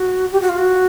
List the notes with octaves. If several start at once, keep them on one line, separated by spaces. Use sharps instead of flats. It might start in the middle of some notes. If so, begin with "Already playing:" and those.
Already playing: F#4
G4
F#4
F4
F#4